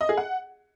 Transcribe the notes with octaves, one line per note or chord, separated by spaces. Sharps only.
D#5
G#4
F#5